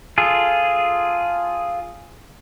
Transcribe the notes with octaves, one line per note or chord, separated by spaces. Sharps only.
F4 G#4 A4